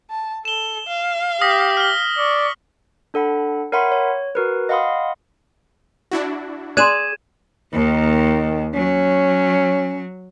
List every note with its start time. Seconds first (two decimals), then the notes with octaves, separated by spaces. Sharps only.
0.10 A5
0.45 A4 E7 G7
0.87 F5
1.41 G4 D#6 A#6 B6
1.77 F6 G7
2.18 D5 C#6
3.14 D4 A4 F#5 B5
3.72 A#4 C#5 E5 F#5 B5 C6
3.92 C#5
4.35 F#4 A#4 B4
4.69 D#5 F5 F#5 B5 C6 D#6
6.11 D4 E4 F#4
6.77 G#4 D5 C6 F#6 G#6 D#7 E7
7.73 D#2 D#3
8.74 F#3 C#4